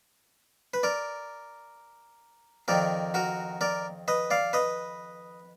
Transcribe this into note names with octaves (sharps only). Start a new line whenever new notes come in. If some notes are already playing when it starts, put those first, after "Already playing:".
B4
A#4 D5
F2 D#3 A#4 D5
F#4 A#4
A#4 D5
B4 D#5
D5 F5
B4 D#5